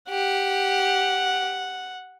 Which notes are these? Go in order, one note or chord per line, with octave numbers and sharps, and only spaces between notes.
G4 F#5